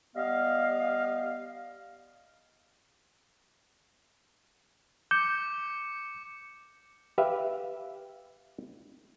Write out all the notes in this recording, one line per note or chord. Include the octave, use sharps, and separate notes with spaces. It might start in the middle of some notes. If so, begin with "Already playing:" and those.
G3 B3 D#5 F5
D6 G6 C#7
G4 B4 E5 F5